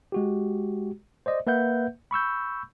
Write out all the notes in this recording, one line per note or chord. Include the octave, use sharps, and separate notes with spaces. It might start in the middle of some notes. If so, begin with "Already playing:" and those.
G#3 F#4 G4
C5 D5 D#5
A#3 B4 E5 F#5 G6
B5 C#6 E6 G6